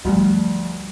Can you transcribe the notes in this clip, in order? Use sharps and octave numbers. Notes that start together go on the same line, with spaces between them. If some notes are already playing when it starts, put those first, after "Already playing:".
D2 G2 F3 F#3